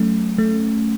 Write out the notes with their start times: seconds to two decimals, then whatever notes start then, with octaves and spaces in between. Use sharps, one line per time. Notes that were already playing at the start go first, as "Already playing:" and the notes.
Already playing: F#3 A3 C#4
0.38 A3